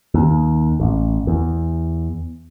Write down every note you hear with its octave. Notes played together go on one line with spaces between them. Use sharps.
D#2
A1
E2